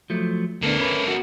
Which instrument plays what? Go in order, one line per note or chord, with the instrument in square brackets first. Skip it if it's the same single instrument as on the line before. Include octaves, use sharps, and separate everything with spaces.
[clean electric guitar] F3 F#3 A3
[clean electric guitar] D2 B3 D4 [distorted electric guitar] A#3 A4
[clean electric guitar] C#4 B4
F#4